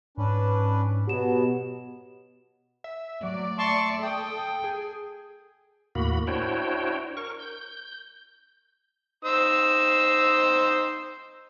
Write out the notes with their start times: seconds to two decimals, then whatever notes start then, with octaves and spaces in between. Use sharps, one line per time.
0.17 G#2 C#4 D4 B4
1.07 B2 F#3 B3 G4 E7
2.84 E5
3.23 F#3 A3 D5
3.58 E5 A5 C6 C#6
4.03 A4 G5 D#6
4.64 G#4
5.95 D#2 A2 A#3 F#4 B5
6.27 D4 E4 F#4 C5 C#5 G5
7.17 A#4 C#6
7.39 G6
9.25 D#4 C5 E6